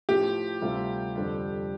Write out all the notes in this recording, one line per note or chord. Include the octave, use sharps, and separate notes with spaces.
A2 F3 A3 G4
D2 C3 G3 C4 F4
F2 D3 G3 D4